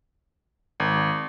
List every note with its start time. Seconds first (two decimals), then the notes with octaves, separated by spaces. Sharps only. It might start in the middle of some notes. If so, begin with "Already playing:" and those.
0.80 G#1